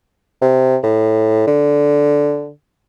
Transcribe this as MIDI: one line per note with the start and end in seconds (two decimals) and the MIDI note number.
0.42 0.76 48
0.83 1.46 45
1.47 2.49 50